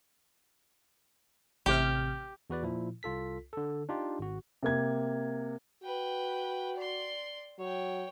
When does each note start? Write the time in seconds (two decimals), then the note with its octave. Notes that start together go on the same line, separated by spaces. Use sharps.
1.66 A1 C3 G4 F6
2.50 E2 F#4 B4 D5
2.63 A#2 F3 E4
3.03 C2 F4 A4 B6
3.53 D3 A4
3.89 D4 D#4 F4 G4
4.19 G#1 F#4
4.63 C3 A#3 G#6
5.83 F#4 B4 G5
6.76 D5 C6
7.59 F#3 C#5 G5